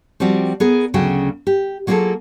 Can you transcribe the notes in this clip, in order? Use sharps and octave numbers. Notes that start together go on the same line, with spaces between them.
F3 G3 C4 F#4 G4
B3 G#4 A#4
D2 C#3 F#3 C#4 F#4 G5
G4
F#3 A#3 F4 F#4 G#4 A4